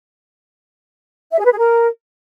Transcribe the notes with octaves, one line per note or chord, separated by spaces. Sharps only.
E5
G#4
B4
G#4
A#4